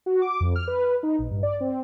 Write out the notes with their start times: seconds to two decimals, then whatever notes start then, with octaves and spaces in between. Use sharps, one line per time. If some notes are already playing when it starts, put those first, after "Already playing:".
0.06 F#4
0.22 D6
0.40 F2
0.55 F6
0.68 B4
1.03 D#4
1.19 A#1
1.31 G2
1.43 D5
1.61 C4